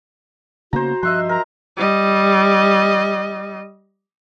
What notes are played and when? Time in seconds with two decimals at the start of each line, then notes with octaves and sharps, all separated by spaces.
0.73 C#3 A#3 B3 F#4 C5 A#5
1.03 G2 F3 D#5 E5 C6 F#6
1.29 A#4 A#5
1.77 G3 D#5